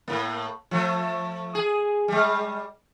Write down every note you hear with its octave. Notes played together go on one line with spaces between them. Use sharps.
A2 A#3
F3 A3
G#4
G3 G#3